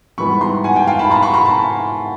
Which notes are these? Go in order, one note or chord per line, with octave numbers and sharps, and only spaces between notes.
G#2 E3 G3 B3 B5 C#6
A#5 C6
F#5 G#5
G5 A5
F5 G5
A5 B5
A#5 C6
B5 C#6
A#5 C6
A5 B5